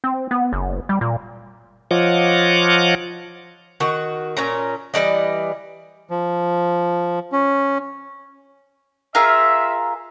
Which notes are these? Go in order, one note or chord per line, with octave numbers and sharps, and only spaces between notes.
C4
B3
F#1
G3
A#2
F3 F4 C#5 D#5 F#5 D6
D#3 F#4
A#2 C#4 A#5
E3 G3 D5 D#5
F3
C#4
F4 G#4 A#4 E5